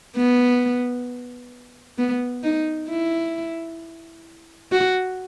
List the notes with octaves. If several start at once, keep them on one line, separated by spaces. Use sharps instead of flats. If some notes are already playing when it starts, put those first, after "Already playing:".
B3
B3
D#4
E4
F#4